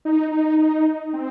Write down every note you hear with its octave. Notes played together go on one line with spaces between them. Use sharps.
D#4
D#4
D#4
C4